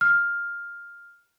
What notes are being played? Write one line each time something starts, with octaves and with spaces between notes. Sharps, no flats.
F6